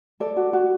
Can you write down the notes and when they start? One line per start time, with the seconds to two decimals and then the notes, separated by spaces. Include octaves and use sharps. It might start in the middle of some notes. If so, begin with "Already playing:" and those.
0.20 A4 D5
0.37 F#4
0.53 F#4